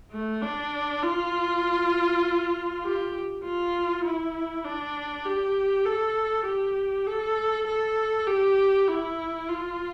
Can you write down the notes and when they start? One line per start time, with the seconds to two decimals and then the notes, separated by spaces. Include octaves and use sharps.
0.12 A3
0.42 D4
1.03 F4
2.84 G4
3.44 F4
4.05 E4
4.65 D4
5.25 G4
5.85 A4
6.46 G4
7.07 A4
7.67 A4
8.27 G4
8.87 E4
9.48 F4